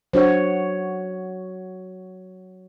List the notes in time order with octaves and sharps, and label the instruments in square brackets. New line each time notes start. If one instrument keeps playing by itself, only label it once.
[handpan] F#3 F#4 C#5 [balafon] D4 C5